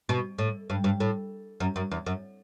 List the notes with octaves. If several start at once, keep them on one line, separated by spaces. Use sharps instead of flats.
B2
A2
G2
G2
A2
F#2
F#2
E2
F#2